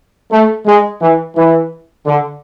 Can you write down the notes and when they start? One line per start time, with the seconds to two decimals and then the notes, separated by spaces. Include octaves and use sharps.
0.32 A3
0.66 G#3
1.02 E3
1.36 E3
2.06 D3